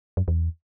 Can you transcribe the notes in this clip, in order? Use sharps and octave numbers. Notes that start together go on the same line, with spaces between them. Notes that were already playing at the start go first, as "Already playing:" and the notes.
F#2
E2